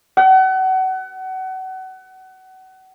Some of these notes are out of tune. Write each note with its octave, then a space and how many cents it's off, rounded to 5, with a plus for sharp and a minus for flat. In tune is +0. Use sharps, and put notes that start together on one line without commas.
F#5 +30